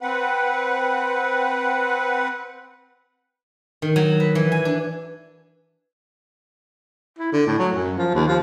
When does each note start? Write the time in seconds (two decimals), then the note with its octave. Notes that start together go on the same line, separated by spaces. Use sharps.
0.01 C4 B4 F#5
3.82 D#3
3.96 F#3
4.20 B4
4.35 E3
4.52 G#5
4.65 D4
7.19 E4
7.33 D3
7.47 A2
7.59 F#3
7.73 F#2
7.98 F3
8.15 D#2
8.28 F3